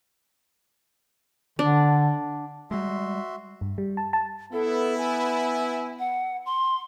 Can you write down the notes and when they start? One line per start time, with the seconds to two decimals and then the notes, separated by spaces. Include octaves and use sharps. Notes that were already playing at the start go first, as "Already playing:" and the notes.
1.59 D3 D4
2.71 G3 G#3 F#4 E5 C6
3.61 G2
3.78 G3
3.97 A5
4.13 A5
4.53 B3 E4 A4
4.98 G#5
5.99 F#5
6.46 C6